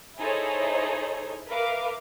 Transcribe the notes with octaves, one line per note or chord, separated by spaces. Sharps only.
D#4 E4 G#4 A4 C5 C#5
A#4 B4 E5 F5 D6